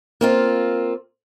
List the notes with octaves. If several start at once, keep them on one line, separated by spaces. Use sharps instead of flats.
A#3 C4 F4